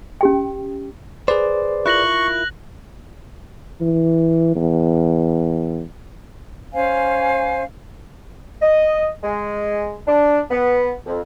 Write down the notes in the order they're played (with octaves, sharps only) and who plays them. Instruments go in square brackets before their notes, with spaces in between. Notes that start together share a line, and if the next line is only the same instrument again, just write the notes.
[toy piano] C#4 G4 G5
[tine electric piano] G#4 B4 D5 [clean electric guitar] C5
[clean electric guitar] E4 F4 A#4 [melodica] C#6 [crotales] F#6 A#6 F#7
[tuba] E3
E2
[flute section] C#4 C5 F5 G#5
[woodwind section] D#5
G#3
D4
B3
F2